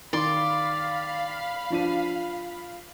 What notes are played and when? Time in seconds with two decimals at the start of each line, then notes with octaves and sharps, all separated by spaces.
0.13 D#3 D5 F5 B5 C6
1.70 F3 D4 D#7